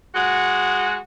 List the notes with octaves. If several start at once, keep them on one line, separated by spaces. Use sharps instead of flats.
G#3 F#4